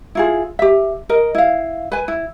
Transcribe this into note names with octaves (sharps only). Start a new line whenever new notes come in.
E4 F4 G#4
G4 E5
A#4 D#5
E4 F5
B4 G#5
E4